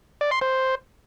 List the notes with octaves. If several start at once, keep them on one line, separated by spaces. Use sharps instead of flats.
D5
C6
C5